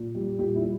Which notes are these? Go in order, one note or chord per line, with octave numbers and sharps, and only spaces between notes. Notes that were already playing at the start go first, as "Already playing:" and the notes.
Already playing: A#2
G3
A#2 G4
E4
G3